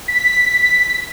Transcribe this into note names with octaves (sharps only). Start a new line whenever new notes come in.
B6